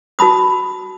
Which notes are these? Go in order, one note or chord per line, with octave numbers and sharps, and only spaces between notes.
F#4 A5 B5 D#6